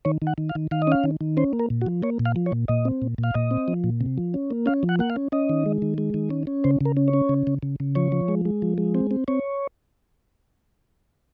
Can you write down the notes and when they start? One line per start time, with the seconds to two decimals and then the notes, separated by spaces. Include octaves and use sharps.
0.05 D#3 C#5
0.22 D#3
0.27 F#5
0.38 D#3
0.49 F5
0.55 D#3
0.71 D#3 F5
0.82 D#5
0.87 C#4 F5
1.04 D#3
1.21 D#3
1.37 C#4 C5
1.53 A#3
1.59 A#4
1.70 A#2
1.81 F#4
1.86 F3
2.03 A#3 C#5
2.19 A#2
2.25 F5
2.36 F3
2.46 C#5
2.52 A#2
2.68 A#2 D#5
2.85 C4
3.02 A#2
3.18 A#2
3.24 F5
3.34 A#2 D#5
3.51 C4
3.68 F3
3.84 A#2
4.01 C3
4.18 F3
4.34 C#4
4.51 A#3
4.66 C#4 F5
4.83 F3
4.89 F#5
4.99 A#3 F#5
5.10 F5
5.16 C#4
5.32 C#4 D#5
5.49 D#3
5.66 G#3
5.82 D#3
5.98 G#3
6.14 D#3
6.31 C#4
6.47 C#4
6.64 C#3 C5
6.81 C#3 A#4
6.97 C#4
7.08 C#5
7.13 C#4
7.29 C#3
7.47 C#3
7.63 C#3
7.80 C#3
7.95 F3 C#5
8.12 F3
8.28 G#3
8.45 G#3
8.62 F3
8.78 G#3
8.95 C4
9.11 C4
9.28 C4 C#5